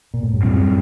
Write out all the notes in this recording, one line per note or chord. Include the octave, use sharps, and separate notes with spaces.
A#2
A2
G2
F#2 A2 G3 C4